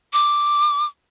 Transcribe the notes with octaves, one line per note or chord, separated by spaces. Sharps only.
D6